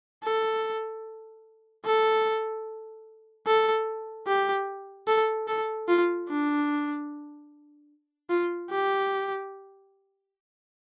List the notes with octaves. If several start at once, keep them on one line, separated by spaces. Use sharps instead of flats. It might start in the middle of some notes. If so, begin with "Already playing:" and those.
A4
A4
A4
G4
A4
A4
F4
D4
F4
G4